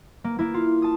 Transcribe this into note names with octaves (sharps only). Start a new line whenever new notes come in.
A#3
A#3 E4
F4
A5 D#6